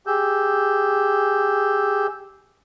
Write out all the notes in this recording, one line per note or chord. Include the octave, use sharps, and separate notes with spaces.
G4 G#4 E6 G6